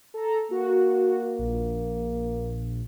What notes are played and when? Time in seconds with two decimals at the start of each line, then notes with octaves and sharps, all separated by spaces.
0.14 A4 A#5
0.51 A#3 F#4
1.38 A#1